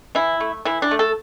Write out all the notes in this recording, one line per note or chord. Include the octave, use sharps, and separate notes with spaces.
E3 E4
A3
E3 E4
D4
A3
A4